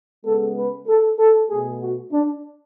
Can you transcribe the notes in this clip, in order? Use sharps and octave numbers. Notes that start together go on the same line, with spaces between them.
C#3 G#3 B3 A4
B4
A4
A4
B2 A3 G#4
F#4
D4